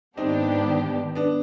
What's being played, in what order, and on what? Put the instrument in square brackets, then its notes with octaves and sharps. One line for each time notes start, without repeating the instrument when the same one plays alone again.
[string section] G#2 D#3 B3 D4 G4 [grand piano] C4 D#4
[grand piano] B3 D4